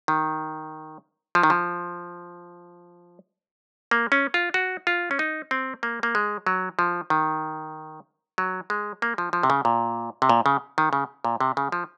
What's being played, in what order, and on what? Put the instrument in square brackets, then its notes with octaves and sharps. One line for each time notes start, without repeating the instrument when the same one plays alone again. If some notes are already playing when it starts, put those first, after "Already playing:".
[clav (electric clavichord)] D#3
F3
D#3
F3
A#3
C#4
F4
F#4
F4
C#4
D#4
C4
A#3
A#3
G#3
F#3
F3
D#3
F#3
G#3
A#3
F3
F3
C3
C#3
A#2
C3
A#2
C#3
D#3
C#3
A#2
C3
C#3
F3